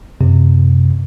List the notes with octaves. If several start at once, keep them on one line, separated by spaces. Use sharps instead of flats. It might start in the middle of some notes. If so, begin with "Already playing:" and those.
F#2 C3